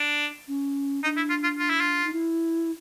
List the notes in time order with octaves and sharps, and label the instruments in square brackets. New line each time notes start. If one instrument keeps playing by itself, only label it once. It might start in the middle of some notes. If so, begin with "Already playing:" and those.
Already playing: [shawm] D4
[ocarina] C#4
[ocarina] D4 [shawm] D#4
[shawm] E4
F4
F4
F4
E4
F4
[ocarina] D#4
E4